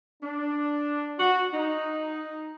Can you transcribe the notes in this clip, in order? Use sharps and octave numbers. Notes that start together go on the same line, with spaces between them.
D4
F#4
D#4